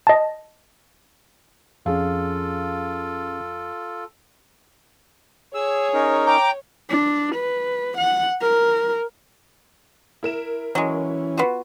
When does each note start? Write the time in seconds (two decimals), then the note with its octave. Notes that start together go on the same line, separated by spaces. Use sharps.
0.07 D#5 A5
1.86 F2 C#4 F4 G#4 A4 F5
5.55 G#4 C#5 E6
5.94 C#4 D#4 A#4
6.26 G5 A#5 D6
6.90 D4
7.35 B4
7.98 F#5
8.41 A#4
10.23 E4 A#4 E7
10.75 E3 F#3 G#3 C#4
11.38 B3 F4 F#4